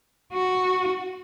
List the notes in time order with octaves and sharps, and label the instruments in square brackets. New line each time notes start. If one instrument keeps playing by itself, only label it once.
[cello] F#4